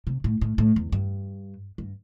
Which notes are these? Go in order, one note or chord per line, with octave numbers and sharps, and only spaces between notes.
C3
A2
A2
A2
E2
G2
G2